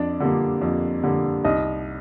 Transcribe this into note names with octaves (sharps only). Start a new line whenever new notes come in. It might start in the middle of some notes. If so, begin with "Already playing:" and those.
Already playing: F2 D4 D5
D3 G3 A#3
F2
D3 G3 A#3
C2 D#4 D#5